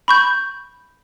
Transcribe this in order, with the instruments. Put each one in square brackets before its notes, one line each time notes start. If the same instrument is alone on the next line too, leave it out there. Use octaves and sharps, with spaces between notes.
[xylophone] B5 C#6 G6